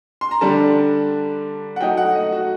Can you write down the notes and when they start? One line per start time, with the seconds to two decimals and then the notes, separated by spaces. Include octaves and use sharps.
0.21 C6
0.31 A#5
0.41 D3 G3 D4 A5
1.76 F#5
1.80 F#3 A3 D#4 G5
1.97 F#5
2.15 D#5
2.32 F#4